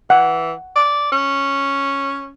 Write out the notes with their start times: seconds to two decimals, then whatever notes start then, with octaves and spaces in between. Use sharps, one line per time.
0.10 E3 F#5
0.76 D5
1.12 C#4